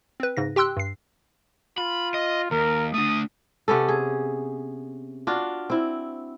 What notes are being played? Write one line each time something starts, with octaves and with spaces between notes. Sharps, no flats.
C4 B4
G#2 C#3 A#6
G4 G5 C6 E6 F#6
G2 C7
F4 B5
D#5
D#2 A#4
A3 D4 D#6
C3 B3 C#4 A4
G#4
D4 F4 F#4
C4 E4